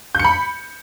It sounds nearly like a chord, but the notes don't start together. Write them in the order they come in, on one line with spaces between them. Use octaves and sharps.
G6 C#7 B5